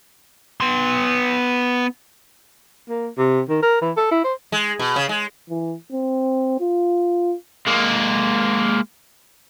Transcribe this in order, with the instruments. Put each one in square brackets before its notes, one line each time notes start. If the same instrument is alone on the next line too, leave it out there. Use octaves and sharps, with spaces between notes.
[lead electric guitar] B3 C6
[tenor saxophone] A#3
C3
D#3
A#4
E3
A4
E4
C5
[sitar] G#3
B2
C#3
G#3
[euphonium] E3
C4
F4
[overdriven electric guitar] G#3 A#3